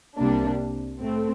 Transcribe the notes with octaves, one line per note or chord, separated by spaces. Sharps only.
C2 C3 G3 A#3 D4
A2 A3 C4